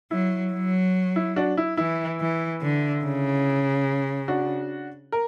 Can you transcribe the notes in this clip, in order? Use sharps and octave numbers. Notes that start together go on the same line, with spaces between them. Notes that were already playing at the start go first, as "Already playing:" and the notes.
F#3 E4
F#3
E4
D4 F#4
E4
E3 E4
E3
D3
C#3
D4 F#4
A#4